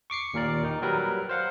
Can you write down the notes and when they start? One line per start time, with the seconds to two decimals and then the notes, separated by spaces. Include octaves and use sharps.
0.10 C#6 D6 C7 C#7
0.34 D#2 A#2 A#4 D5
0.63 D#3 D#4
0.82 F#3 G3 A#4 B4
1.29 C5 F5 F#5